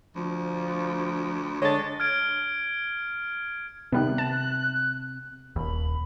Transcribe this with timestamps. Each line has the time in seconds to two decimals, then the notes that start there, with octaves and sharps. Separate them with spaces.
0.16 D2 F3
1.62 D3 G#3 D4 C#5 A6
2.00 F6 G#6 D7
3.92 C3 D#3 G3 B3 F#6
4.18 A5
5.56 D#1 D#2 B5